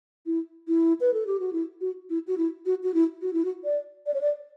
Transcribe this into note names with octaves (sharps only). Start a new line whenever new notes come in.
E4
E4
B4
A4
G4
F#4
E4
F#4
E4
F#4
E4
F#4
F#4
E4
F#4
E4
F#4
D5
D5
C#5
D5